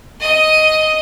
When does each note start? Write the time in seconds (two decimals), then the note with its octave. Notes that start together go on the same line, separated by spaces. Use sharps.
0.21 D#5 D#6